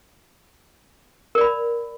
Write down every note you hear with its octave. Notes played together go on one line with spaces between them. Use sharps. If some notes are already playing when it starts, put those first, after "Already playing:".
A#4 D5 B5